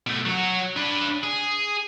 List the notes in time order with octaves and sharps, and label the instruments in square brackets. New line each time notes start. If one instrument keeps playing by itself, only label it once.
[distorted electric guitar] B2 A3
F#3 F#4
D4 B4
G#4